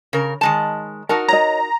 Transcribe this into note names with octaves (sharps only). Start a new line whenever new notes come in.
C#3 A#4
D#3 G#3 A5
D#4 F#4 A#4 A5
C#5 D#5 A#5